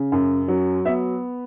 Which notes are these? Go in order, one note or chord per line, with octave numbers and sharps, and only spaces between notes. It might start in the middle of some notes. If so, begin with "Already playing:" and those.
Already playing: C#3
F#2
F#3
B3 E5